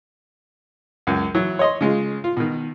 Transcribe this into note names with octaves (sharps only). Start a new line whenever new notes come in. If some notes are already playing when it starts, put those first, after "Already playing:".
C#2 F#2
E3 F#3
C#5 D#5 C6
C#3 G#3 F4
F4
B2 D#3